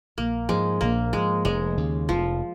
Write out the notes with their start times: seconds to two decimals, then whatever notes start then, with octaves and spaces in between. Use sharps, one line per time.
0.18 A#1 A#3
0.49 G#2 F3 G#3
0.81 A#1 A#3
1.13 G#2 F3 G#3
1.45 F1 G#3
1.77 D#2 C#3
2.09 F1 F3